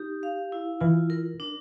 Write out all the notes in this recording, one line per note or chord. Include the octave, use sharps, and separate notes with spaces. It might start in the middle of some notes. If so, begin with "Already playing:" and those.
Already playing: D#4 G4
F5
E4
E3 F4
A#4
D4